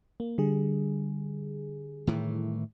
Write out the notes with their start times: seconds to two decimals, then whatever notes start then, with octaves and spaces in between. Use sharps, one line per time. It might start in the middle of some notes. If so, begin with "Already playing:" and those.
0.20 A#3
0.38 D3 G3 G#4
2.07 A2 D#3 E3